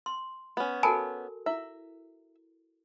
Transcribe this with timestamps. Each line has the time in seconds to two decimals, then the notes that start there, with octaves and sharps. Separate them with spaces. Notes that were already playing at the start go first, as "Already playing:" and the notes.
0.06 C6
0.57 B3 C#4
0.83 F#4 A4 A#4 G#5 A5 B5
1.46 E4 E5